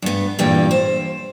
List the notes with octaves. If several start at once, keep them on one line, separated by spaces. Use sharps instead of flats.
G2 B3
E2 G2 A#2 E3 G3 G5
C5